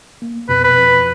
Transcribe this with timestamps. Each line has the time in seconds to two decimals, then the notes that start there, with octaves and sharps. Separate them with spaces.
0.22 A#3
0.49 F2 B2 B4
0.64 B4
0.77 F2